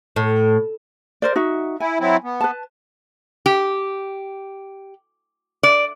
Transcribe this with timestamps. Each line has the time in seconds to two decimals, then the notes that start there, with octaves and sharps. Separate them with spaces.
0.16 A2
1.22 A#4 C5 D5
1.36 D#4 F#4 E5
1.80 E4 G#5
2.00 F#3 C4 E4
2.24 B3
2.41 B4 A5
3.46 G4
5.63 D5